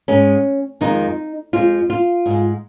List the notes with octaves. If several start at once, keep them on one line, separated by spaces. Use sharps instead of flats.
G#2 G#3 C#4
F2 D#3 G#3 D#4
F2 F3 G#3 F4
F4
G#2 G#3